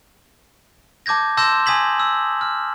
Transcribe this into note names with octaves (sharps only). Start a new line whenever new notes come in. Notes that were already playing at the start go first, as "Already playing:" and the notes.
A5 D6 G6 G#6 A#6
A5 C6 E6 G6 A#6 E7
G#5 D#6 G#6 B6 F#7
E6
F6